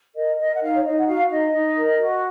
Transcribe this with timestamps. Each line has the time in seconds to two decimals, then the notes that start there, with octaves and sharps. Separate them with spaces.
0.16 A#4 D#5
0.39 A#4 D#5
0.55 F#5
0.62 D#4 F5
0.74 C#5
0.85 D#4 D#5
0.98 F#5
1.07 F#4 F5
1.30 D#4 D#5
1.53 D#4
1.76 A#4
1.99 F#4